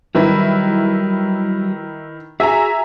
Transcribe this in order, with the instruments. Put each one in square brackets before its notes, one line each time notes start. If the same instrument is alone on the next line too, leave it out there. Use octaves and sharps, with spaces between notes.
[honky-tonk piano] D#3 E4 B4 [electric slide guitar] F#3 G3
[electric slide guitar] F#4 G#4 [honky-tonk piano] E5 G#5 A#5